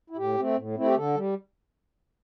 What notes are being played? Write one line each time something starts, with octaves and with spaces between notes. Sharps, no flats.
E4
A2 G4
A3 C4
A2
A3 C4 E4
G4
D3 A4
G3